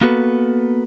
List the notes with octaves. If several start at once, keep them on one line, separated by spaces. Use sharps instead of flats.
A#3 B3 F#4 A4 B4